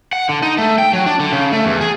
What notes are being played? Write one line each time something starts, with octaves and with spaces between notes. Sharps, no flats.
F#5
D3
D#4
A3
G5
F#3
D4
D3
C#3
A3
E2
G#4